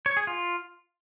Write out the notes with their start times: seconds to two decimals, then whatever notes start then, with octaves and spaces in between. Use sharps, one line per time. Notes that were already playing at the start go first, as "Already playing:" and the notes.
0.06 C#5
0.17 G#4
0.27 F4